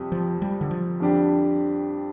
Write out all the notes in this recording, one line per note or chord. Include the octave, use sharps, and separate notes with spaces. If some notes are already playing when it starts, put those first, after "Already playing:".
Already playing: F2 C3 G3
F3
G3
D3
F3
F2 D3 G3 D4 G4